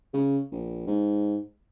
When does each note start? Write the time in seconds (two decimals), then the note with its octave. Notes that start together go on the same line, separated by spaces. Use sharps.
0.14 C#3
0.51 A#1
0.87 G#2